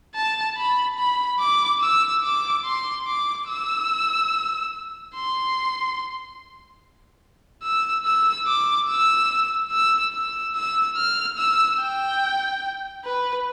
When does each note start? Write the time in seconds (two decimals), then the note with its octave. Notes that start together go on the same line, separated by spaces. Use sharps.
0.15 A5
0.58 B5
0.98 B5
1.40 D6
1.81 E6
2.23 D6
2.65 C6
3.07 D6
3.48 E6
5.15 C6
7.63 E6
8.06 E6
8.47 D6
8.88 E6
9.71 E6
10.13 E6
10.55 E6
10.97 F6
11.38 E6
11.80 G5
13.05 B4